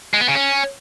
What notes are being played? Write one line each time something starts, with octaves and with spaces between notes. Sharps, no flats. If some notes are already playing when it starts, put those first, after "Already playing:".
G#3
B3
C#3
C#4